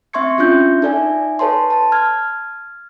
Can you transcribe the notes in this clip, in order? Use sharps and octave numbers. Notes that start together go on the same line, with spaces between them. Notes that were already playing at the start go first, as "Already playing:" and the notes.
C4 E5 C6 C#6 G#6 C#7
C#4 D4 F4 E5 F#6 G6
D#4 A4 D5 E5 G#5
A4 B4 C#5 A5 C6
A5
F6 G#6